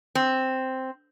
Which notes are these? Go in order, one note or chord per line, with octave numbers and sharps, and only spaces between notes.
C4